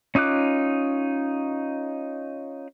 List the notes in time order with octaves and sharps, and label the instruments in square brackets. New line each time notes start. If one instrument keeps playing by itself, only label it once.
[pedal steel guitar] C#4 D#4 F4 D6 F#6